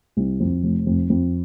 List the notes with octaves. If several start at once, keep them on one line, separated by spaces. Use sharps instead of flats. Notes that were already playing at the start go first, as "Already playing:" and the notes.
C2
F2
F1
F2
F2